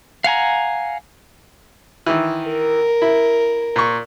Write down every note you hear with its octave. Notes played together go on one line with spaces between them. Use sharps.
F5 F#5 G#5 A#5
D#3 E3
A#4
E4
A#2 C#6